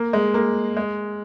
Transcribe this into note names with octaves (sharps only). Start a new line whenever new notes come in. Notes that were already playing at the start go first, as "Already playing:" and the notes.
Already playing: A#3
G#3
A#3
G#3